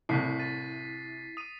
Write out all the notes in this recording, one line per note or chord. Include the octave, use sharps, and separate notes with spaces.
C2 A2 E4 B6 C7
A6 D#7
D#6 D#7